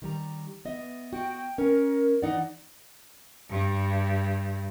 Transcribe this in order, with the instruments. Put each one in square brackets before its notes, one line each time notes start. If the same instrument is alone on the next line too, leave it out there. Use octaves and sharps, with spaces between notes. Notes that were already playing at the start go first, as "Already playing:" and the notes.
[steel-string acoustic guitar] D#3 G3 A#5
B3 D#5 E5
[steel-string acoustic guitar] F#4 D#5 [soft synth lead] G5
[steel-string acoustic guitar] C#4 [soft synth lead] A#4
[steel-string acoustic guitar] E3 D#4 D5 [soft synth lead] F#5
[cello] G2